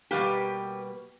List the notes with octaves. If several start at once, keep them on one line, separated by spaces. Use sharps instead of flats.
B2 G3 A#3 G4 B4